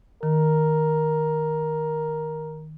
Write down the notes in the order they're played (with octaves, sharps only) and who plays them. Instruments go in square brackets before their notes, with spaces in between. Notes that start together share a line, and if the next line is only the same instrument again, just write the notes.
[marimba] D#3 [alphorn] A#4